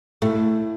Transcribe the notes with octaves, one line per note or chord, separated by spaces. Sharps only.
A2 A3